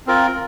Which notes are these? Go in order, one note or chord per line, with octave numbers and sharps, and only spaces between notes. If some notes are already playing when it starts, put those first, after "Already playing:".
C4 F4 A#4